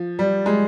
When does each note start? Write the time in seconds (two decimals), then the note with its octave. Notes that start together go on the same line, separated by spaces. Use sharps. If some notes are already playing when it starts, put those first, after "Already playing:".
Already playing: F3
0.19 G3
0.46 G#3